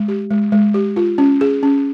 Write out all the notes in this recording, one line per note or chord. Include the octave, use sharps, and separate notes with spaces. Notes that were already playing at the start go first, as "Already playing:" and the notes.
Already playing: G#3
G4
G#3
G#3
G4
F4
C#4
G#4
C#4